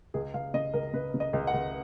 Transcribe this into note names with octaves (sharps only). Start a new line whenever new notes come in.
C#2 G#4
C#2 F5
C#3 D#5
C#2 A#4
C#3 B4
C#3
D#5
C#2
F#5
C#2